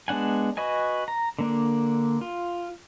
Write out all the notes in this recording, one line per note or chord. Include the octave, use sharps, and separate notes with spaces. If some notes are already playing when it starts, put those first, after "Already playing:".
G#3 B3 D4 F#5 G#5
F#4 B4 D#5 G#5
A#5
D3 A#3 D4
F4